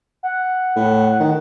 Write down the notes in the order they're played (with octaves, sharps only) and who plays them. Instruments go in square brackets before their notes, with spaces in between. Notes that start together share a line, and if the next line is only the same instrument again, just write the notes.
[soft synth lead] F#5
[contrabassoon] A2
D#3